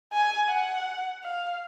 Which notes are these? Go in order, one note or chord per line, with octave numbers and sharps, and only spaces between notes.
G#5
F#5
F5